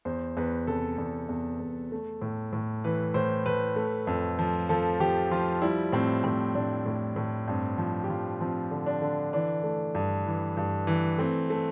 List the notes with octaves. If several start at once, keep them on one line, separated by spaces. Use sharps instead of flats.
E2 C5
E2 B4
C3 A4
E2
E2
E2
A3
A2
A2
E3 B4
A2 C5
A2 B4
A3
F2
F3
F3 A4
F3 G4
F3 F4
G3 E4
A2 C4
A2 C4
A2 D4
A2
A2
G2 C4
F3
G4
F3 F4
F3 C4
D3
D4
D3
E3 D4
A3
G2
E3
G2
E3
A3 C4
A3